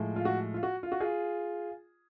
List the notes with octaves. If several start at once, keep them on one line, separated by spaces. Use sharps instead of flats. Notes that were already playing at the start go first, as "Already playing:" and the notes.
Already playing: A2 F3 G#3
F4
F#4
F4
F#4
F4
F#4
F4 G#4